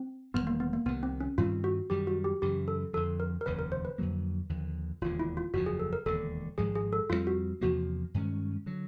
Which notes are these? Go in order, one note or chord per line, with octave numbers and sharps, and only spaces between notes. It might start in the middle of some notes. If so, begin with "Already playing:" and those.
Already playing: C4
E1 D#2 D#3 G3 B3
A#3
B3
A#3
C2 C3 D#3 B3
C4
C#4
G2 D#3 G3 C4 F4
F#4
F#2 D#3 G3 G4
F#4
G4
F#2 C#3 E3 G4
A4
F2 D3 F3 A4
A#4
A#4
F1 D#2 C#3 B4
A#4
C5
B4
F2 D3 F#3 A#3
D#2 D3 F3
E1 D#2 D3 F4
E4
F4
F#1 E2 C#3 F3 F#4
G#4
A4
A#4
E1 D#2 D3 A4
G#1 G#2 F3 G#3 G#4
G#4
A4
F2 D3 G3 C4 F4
F#4
E2 C3 F3 A#3 F#4
G2 D#3 G#3 C#4
D3 F#3